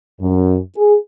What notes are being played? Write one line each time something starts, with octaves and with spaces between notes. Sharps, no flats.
F#2
G#4